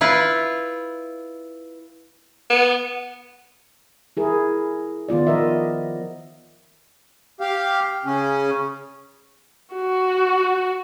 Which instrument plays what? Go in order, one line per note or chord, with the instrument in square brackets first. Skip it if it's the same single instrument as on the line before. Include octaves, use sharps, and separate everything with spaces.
[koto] E4 F4 B4
[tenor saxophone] B3
[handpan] E4 G#4 A#4
D#3 B3 F4 D5
F3 F4 A#4 D#5 E5
[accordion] G4 F5
C#3 C#4
[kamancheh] F#4